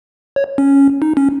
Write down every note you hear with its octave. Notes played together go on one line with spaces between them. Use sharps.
C#5
C#4
D#4
C#4